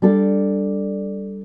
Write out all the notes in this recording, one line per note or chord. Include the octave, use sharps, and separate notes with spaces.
G3 D4 A4